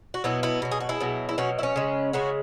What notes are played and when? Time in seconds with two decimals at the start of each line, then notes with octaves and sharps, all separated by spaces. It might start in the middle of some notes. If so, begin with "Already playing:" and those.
0.14 F#4
0.24 B2 F#3 B3 E4
0.43 B3 E4
0.62 B2 F#3
0.71 G#4
0.80 F#4
0.89 E4 G#4
1.00 B2 F#3
1.29 E4
1.38 B2 F#3 C#4 F#4
1.59 E4
1.63 C#4
1.76 C#3 G#3
2.13 C#3 G#3 C#4 F#4